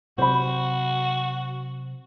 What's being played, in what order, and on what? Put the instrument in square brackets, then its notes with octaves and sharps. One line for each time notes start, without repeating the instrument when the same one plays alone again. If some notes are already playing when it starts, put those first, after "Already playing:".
[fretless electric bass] C3 F#3 [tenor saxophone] F#4 [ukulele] C5 B5